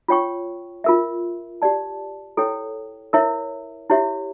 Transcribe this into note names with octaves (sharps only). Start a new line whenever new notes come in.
F4 C#5 G5 C#6
F4 A#4 E5
G4 D5 A5
E4 A4 C#5 G5
E4 A#4 C#5 E5
E4 G4 C#5 E5